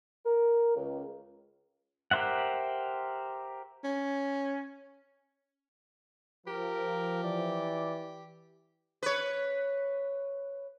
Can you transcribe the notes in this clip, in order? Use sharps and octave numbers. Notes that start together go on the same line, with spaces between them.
A#4
C#2
G4 A#4 C5 E5 F#5
C#4
F3 G4 A#4
E3 D5
B4 C#5